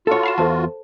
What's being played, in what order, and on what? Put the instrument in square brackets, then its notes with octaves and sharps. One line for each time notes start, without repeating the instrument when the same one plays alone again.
[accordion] F4 F#4 [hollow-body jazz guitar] A4 C#5
[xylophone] B5 C7 E7
[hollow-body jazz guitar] E2 [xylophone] A4 C5 A5